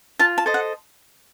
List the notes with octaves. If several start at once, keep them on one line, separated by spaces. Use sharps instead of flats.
F4 A5
A5
A4 C5 D#5
F#5